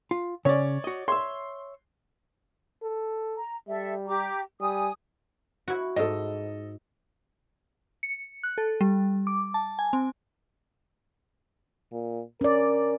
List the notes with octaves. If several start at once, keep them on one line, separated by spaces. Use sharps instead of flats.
F4
C#3 C#4 C#5 D5
F#4 D#5
C#5 E5 C6
A4
A#5
G3 A4 E5
G4 A#5 D6
G3 G#5 D#6
E4 F#4
G#2 A4 D#5
C#7
F#6
A4
G3
D6
A5
G#5
C4
A#2
C#4 A#4 D5